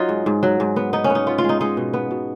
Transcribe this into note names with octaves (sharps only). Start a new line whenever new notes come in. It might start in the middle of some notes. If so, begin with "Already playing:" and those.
Already playing: F#3 D#4 F4
G#2
G#2
F#3
G#2
B3
B3 D#4
C#4
B3
D#4
B3 F4
F4
G#3
D#4
G#3 D#4
B2
B3
B2